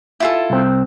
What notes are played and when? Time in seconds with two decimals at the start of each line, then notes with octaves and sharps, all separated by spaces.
0.20 E4 F4 A4
0.50 C2 C4